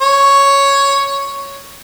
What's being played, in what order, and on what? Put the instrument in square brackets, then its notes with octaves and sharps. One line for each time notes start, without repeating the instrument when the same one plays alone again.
[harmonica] C#5